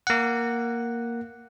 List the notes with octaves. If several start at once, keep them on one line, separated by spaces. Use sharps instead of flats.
A#3 F#5